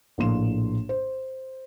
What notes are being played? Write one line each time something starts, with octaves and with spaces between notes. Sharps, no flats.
A#1 A2 A#3 C6 E7
C5